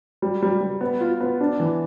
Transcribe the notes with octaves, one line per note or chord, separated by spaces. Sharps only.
G3
G3
G3
B3
F4
B3
D4
E3